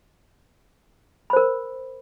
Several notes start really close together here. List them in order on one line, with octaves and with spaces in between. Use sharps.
B5 C5 A#4